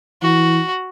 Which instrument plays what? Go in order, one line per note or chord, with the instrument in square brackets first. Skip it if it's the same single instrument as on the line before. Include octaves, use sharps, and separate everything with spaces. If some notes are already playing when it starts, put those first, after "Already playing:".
[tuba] E3 [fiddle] F#4